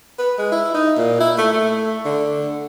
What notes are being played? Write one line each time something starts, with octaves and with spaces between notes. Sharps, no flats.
B4
G#3
E4
D#4
A#2
E4
A3
A3
D3